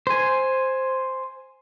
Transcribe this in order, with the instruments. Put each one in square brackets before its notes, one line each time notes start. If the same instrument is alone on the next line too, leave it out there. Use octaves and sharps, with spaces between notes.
[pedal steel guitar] C5 G#5